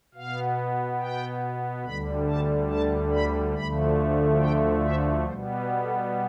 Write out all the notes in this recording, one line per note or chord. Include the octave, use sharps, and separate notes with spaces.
B2 B3 F5
G5
D2 D3 G3 B5
A5
A5
B5
D2 D3 F3 A3 B5
G5
E5
B2 G3 B3 C5
B4
A4